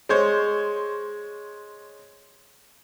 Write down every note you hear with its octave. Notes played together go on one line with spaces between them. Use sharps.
G#3 C5 C#5